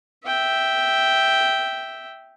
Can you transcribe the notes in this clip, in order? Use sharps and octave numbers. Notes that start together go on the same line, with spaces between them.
E5 G5